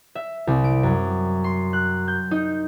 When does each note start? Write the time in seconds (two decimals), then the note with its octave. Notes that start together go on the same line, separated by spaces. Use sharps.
0.15 E5
0.47 C2
0.64 D7
0.83 F#2
1.44 C6
1.73 F#6
2.08 G6
2.31 D#4